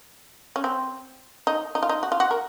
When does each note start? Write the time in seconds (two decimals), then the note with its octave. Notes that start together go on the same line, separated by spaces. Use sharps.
0.56 C#4
0.64 C4
1.47 D#4
1.75 D#4
1.83 F4
1.89 D#4
2.03 F#4
2.12 F4
2.20 F#4
2.31 A#4